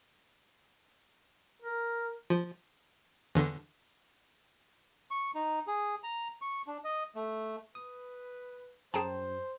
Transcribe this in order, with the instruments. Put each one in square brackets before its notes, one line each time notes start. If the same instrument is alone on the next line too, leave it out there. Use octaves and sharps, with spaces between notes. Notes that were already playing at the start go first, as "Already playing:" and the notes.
[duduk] A#4
[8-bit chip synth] F3
E2 D3
[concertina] C#6
D#4
G#4
A#5
C#6
D4
D#5
A3
[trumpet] B4 [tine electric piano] D#6
[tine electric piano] F#2 [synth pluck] G#4 G5 A#5 [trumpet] C5 [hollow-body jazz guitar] A5